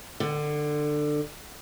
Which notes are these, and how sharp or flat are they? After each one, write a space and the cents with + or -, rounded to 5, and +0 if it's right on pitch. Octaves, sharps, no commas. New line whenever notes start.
D3 +20